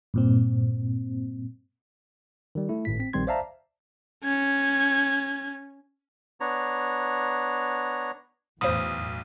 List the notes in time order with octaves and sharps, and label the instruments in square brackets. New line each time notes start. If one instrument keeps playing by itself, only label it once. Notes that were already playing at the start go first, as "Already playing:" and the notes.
[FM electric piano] G2 A#2 C4
[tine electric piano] D#3 G3
A3 E4
G#1 A2 B6
C4 B6
A#1 D#3 G3 C4 C6 G#6
C5 D5 E5 F5 A5 A#5
[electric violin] C#4 G#6
[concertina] B3 D4 C#5 A#5
[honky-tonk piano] B1 [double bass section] E2 A2 [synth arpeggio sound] C5 F5 B5 [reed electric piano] D#6